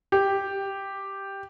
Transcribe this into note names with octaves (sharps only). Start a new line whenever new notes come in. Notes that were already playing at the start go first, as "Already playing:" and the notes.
G4